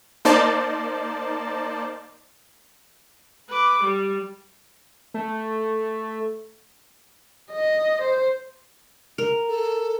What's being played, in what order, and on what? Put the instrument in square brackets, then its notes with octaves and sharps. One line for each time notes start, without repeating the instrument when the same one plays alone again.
[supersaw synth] A#3 D#4 C5 D5 A5
[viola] B4 D6
G3
[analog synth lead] A3
[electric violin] D#5
C5
[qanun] A#4
[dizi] A4